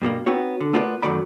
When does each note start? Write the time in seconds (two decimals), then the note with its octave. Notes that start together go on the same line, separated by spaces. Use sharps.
0.02 G2 B2 G3 A#3
0.26 B3 C4 D#4 F#4 C#5
0.61 D3
0.73 A3 B3 F4 A#4 B4 D5
1.02 F#2 D#3 F#3 A3 D5 B5